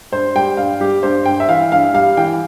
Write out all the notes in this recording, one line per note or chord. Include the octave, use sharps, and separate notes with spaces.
G2 C5
G3 G5
G2 F5
G3 G4
G2 C5
G2 G5
E5
E3 F5
G2 F5
G3 F5
E3 G5